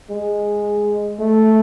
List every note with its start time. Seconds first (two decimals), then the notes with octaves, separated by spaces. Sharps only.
0.10 G#3
1.20 A3